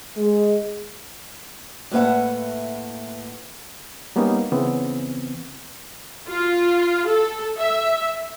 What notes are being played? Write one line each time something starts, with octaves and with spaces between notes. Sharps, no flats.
G#3
A2 A#3 B4 E5 F#5
G3 A#3 B3 C#4 D#4
C#3 E3 B3 C4
F4
A4
E5